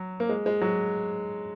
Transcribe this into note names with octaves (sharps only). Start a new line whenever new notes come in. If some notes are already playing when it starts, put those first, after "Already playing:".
Already playing: F#3
A#3
G#3
G#3
F#3